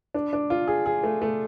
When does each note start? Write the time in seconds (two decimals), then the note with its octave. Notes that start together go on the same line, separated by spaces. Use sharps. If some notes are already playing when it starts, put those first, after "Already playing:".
0.14 D4
0.33 D4
0.50 F4
0.68 G#4
0.86 G#4
1.04 A3
1.22 A3